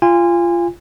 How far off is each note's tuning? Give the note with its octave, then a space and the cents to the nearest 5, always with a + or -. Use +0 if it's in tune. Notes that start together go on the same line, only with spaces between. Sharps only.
F4 -20 G#5 -30